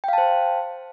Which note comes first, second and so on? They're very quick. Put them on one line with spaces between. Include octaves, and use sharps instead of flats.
G5 F5 A5 C5